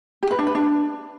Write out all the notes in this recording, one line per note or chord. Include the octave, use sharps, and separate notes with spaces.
G4
B4
D4
B4
D4